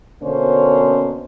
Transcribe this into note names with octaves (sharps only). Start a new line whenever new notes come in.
B2 D3 A#3 C#4 C5